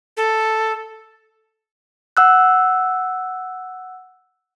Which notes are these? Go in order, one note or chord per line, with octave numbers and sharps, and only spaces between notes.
A4
F#5 E6 F#6